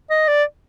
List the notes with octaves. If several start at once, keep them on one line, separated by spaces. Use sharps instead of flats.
D#5
D5